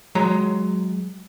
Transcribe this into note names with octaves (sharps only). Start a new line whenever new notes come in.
F#3 G#3 C#5 A#5